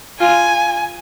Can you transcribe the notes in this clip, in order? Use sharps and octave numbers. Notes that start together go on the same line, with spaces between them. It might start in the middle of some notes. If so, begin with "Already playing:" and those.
F4 G#5